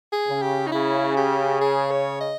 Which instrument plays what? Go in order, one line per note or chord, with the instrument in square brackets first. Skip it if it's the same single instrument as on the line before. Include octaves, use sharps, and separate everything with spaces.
[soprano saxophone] G#4
[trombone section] C#3
[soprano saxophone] G4
D#4
[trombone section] C#3 [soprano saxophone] E4
[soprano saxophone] G4
G#4
C#5
D#5